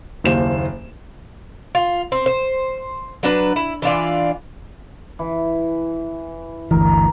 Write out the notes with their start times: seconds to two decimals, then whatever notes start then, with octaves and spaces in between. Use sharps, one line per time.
0.24 F#1 D#2 C5 E7
1.75 F4
2.12 C4
2.26 C5
3.23 F#3 D4 B4
3.56 E4
3.82 E3 D4 F4 D5
5.19 E3
6.71 G1 D2 E3 A#4